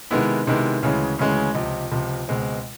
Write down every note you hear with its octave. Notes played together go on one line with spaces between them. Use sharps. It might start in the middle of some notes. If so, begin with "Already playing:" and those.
C3 D#3 G#3 B3 E4
C3 D#3 G#3 B3 E4
D2 C#3 E3 G#3 C#4
D2 C#3 E3 G#3 C#4
C#2 C3 F3
C#2 C3 F3
C#2 B2 G#3 C4